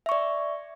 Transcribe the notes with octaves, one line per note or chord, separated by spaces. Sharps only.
D5 E5 C#6